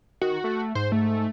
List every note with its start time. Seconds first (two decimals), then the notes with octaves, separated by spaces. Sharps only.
0.22 D#3 F#4
0.44 A3
0.75 G#2 C5
0.92 A3